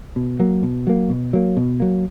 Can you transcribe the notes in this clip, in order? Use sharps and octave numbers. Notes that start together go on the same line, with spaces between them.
B2
F#3 A#3
B2
F#3 A#3
B2
F#3 A#3
B2
F#3 A#3